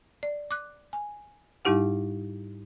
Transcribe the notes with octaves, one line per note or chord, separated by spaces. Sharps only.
D5
D6 F#6
G#5
G#2 G3 D#4 E4 G4 F#5